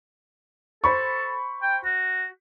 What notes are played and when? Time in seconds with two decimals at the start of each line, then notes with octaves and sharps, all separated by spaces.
0.84 A4 C5 B5 C#6
1.62 G5
1.85 F#4